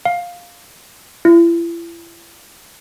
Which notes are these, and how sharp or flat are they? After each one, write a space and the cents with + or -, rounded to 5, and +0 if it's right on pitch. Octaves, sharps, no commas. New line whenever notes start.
F5 +10
E4 +40